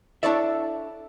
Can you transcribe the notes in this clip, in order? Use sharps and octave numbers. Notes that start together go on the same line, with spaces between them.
D4 E4 A4 C#5 D5 E5